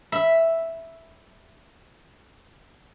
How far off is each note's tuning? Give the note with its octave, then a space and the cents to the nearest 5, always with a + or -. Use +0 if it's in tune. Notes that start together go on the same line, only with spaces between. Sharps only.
E5 +0 B5 +0